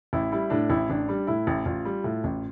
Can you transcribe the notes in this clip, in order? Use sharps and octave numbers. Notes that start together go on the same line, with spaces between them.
A1 E4
G3 E4
A2 D4
A1 E4
A1 D4
G3
A2 E4
A1
A1 F4
G3
A2
A1